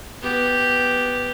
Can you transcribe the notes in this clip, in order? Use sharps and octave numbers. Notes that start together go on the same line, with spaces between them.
B3 G4